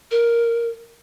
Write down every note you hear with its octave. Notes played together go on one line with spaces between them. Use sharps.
A#4